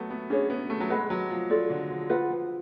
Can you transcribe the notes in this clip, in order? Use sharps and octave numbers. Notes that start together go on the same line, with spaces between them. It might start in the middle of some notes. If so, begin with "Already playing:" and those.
Already playing: F#3 A3 B3
B3
C#4 D4 G#4 C#5
B3
A3
F#3
G#3 B4 F#5 B5
F#3
F3
F4 A4 D5
D3
F3
F3 F4 B4 F#5
F3